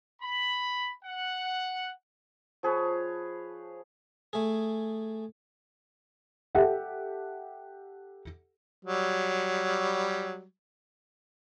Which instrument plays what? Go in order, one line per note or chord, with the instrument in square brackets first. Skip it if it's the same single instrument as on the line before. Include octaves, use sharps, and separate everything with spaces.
[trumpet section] B5
F#5
[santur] F3 G#4 B4 C#5
[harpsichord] A3 G#4
[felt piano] G4 A4 E5 F#5 G5
[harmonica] F#3 G3